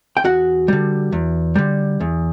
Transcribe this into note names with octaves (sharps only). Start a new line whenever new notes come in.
G5
E2 F#4 F#5
D3 G3
E2
D3 G3
E2